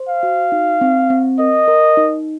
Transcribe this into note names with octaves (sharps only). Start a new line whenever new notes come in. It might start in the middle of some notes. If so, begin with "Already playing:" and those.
Already playing: C5
F5
F#4
D#4
C4
C4
A#4 D#5
A#4
D#4